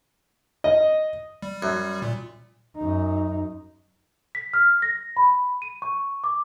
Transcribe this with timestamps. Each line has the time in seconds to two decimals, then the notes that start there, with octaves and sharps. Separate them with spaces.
0.64 D#5
1.42 G3
1.63 F#2
2.02 A#2
2.77 F#2 D#4
4.35 B6
4.54 F6
4.82 A#6
5.17 B5
5.62 D#7
5.82 C#6
6.24 D6